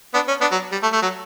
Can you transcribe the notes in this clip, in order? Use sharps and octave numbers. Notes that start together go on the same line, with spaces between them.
B3 D4
C#4
B3 D4
F#3
G3
A3
A3
F#3